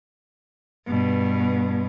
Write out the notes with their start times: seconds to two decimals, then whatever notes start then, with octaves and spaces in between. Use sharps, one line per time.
0.87 G2 B2